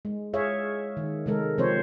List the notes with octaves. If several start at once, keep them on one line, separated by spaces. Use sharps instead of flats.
G#3
G#4 C#5 E5 F5
D#3
C3 D#3 G#3 A4 A#4
C3 F3 C4 C5 C#5